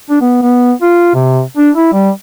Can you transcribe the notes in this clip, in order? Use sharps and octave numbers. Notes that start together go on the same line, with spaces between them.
D4
B3
B3
F4
C3
D4
E4
G3